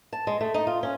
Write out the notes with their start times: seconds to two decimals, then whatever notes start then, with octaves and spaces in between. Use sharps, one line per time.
0.13 A5
0.27 G#3
0.41 A3
0.54 D#4
0.67 F4
0.83 C#4